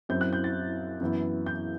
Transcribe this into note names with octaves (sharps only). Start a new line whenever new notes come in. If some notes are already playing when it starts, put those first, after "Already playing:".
F#2 F#3 C4 E4 G6
F#6
G6
A6
F#2 E3 B3 E4
G6